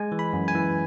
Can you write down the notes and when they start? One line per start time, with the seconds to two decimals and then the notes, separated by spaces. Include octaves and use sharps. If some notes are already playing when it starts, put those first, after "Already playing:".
Already playing: G#3 G#5
0.12 E3
0.19 B5
0.33 F#2
0.48 G#5
0.55 E3